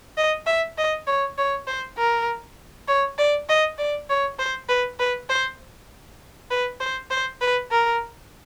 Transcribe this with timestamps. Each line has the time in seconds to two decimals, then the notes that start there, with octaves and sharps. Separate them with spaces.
0.17 D#5
0.46 E5
0.78 D#5
1.07 C#5
1.38 C#5
1.67 C5
1.98 A#4
2.88 C#5
3.18 D5
3.49 D#5
3.78 D5
4.09 C#5
4.39 C5
4.69 B4
4.99 B4
5.30 C5
6.50 B4
6.81 C5
7.11 C5
7.41 B4
7.71 A#4